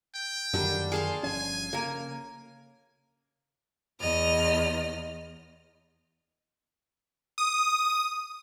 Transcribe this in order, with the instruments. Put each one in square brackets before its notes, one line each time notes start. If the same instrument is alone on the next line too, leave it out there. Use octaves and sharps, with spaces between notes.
[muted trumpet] G5
[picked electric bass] F#2 D#3 A#3 [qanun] D3 G3 D4
[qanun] G#4 A5 C6 [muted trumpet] F5
[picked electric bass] G1 F3 C#4 [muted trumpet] G#5
[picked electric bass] C#3 [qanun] A#3 A#4
[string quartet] E2 D#5 F6
[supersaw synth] D#6